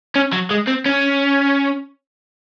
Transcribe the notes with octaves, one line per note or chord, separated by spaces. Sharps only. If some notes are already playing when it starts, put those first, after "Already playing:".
C#4
F#3
G#3
C4
C#4